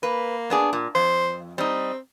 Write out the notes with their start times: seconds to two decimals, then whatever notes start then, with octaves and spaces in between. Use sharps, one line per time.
0.03 A#3 B4
0.50 B3 D4 G#4
0.73 A#2
0.95 F2 C5
1.58 G3 C4 D#4